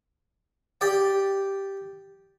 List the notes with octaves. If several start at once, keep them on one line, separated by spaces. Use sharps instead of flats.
G4 D5 G5